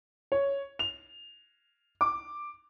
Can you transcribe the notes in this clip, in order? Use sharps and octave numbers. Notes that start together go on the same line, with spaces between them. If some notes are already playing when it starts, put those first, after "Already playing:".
C#5
F7
D6